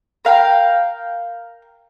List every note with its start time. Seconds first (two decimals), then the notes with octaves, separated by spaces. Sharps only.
0.25 A#4 F5 G5